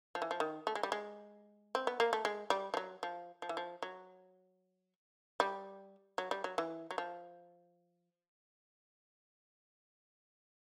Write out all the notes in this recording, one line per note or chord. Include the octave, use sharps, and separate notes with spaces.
F3
E3
F3
D#3
A3
G#3
G3
G#3
C4
B3
A#3
A3
G#3
G3
F3
F#3
F3
F3
E3
F3
F#3
G3
F#3
G3
F#3
E3
F#3
F3